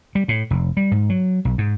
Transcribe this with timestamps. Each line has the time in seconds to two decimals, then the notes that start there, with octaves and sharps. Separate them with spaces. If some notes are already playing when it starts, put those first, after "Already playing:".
0.15 G3
0.28 A2
0.50 F1
0.77 G3
0.91 G#2
1.10 F#3
1.45 B1
1.58 G#2